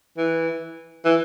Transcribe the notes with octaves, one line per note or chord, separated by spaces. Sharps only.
E3
E3